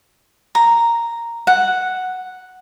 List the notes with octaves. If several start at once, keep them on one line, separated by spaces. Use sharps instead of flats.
A#5
F#5